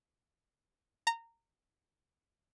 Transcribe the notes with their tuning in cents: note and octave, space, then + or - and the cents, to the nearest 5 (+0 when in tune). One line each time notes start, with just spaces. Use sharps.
A#5 -20